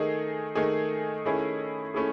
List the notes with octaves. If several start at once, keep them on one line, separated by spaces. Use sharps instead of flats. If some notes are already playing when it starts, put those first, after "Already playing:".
Already playing: D#3 A3 D#4 G#4
D#3 A3 D#4 G#4
D#3 A3 C#4 E4 G#4
A3 C#4 E4 G#4